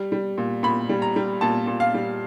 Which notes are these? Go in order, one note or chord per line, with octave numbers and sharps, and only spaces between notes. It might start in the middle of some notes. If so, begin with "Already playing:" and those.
Already playing: G3
G3
A#2
A#2 B5
G3
A#5
G3
A#2 A5
A#2
F5
G3